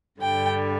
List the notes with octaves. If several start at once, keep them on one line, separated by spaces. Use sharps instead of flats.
G2 D3 G3 G5